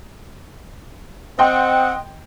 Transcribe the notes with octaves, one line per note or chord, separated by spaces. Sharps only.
C4 D#5 F#5 G5 C6